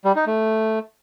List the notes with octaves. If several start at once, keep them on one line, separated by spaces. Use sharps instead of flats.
G3
D#4
A3